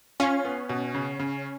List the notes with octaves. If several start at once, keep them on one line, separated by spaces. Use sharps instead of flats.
C#4 F4
B3
B2
C#3
C#3